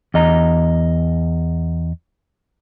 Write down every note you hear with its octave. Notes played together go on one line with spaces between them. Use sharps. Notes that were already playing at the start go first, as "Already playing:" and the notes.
E2 D#5 A#5